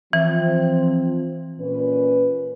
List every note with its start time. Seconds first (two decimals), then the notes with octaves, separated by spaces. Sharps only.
0.13 E3 F3 C4
1.60 A#2 C#4 B4